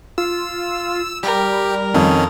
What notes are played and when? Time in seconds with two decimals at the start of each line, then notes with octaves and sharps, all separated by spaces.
0.18 F4 E6
1.23 G3 G4 A#4
1.94 F2 D#3 C#4